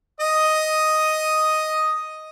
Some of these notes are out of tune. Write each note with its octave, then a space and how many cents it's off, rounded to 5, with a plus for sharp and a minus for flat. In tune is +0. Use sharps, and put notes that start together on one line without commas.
D#5 +5 D#6 +0